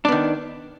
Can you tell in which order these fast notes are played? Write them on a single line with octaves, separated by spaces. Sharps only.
D4 B3 D#3